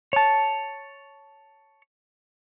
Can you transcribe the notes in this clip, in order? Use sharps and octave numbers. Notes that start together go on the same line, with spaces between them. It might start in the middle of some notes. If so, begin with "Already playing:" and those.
C#5 A5